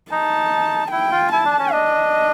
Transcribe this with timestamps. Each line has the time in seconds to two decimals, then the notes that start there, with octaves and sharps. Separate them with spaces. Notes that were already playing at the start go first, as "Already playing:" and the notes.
0.11 D#4 A5
0.91 E4 G5
1.12 F4
1.32 E4 A5
1.45 D4
1.59 C#4
1.72 D4 D#5